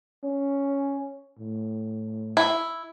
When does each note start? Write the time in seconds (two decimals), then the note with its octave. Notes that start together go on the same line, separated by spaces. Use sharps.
0.24 C#4
1.39 A2
2.37 E4